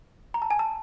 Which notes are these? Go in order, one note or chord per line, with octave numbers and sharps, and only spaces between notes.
A#5
A5
G#5
A5